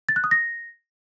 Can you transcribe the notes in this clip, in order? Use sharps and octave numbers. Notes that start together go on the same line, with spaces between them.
A6
F#6
D#6
A#6